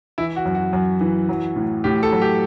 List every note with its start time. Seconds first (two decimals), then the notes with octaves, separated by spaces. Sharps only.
0.18 E3 E4
0.36 F#4
0.45 F#2
0.55 F#4
0.73 F#2
1.01 E3
1.29 F#3
1.56 A2
1.84 A2 G4
2.03 A4
2.12 F#3
2.22 G4